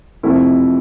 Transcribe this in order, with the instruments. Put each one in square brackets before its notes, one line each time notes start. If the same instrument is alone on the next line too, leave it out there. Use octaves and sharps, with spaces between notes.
[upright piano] F2 C3 F3 A3 E4